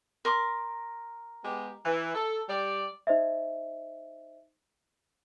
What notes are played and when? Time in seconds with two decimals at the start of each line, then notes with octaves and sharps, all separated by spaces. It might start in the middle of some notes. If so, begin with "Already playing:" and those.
0.25 A#4 C6 D6
1.45 G#3 B3 G4
1.85 E3
2.15 A4
2.49 G3 D5
3.07 D#4 C5 D#5 E5